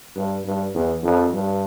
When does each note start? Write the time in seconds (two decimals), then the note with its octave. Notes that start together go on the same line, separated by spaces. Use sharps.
0.16 G2
0.45 G2
0.74 E2
1.03 F2
1.32 G2